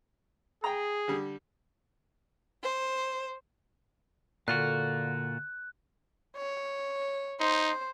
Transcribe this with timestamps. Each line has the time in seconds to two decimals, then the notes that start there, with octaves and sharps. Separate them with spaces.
0.64 G#4 G5 A#5
1.08 D3 G3
2.62 C5
4.48 A#2 D3 F4 F#4 F#6
6.37 C#5
7.40 D#4 C5